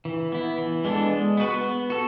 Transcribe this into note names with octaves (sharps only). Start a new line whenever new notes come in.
E3
B3 E4
E3
G#3 B3 D4 A4
G#3
B3 F#4 B4
B3
F#4 A4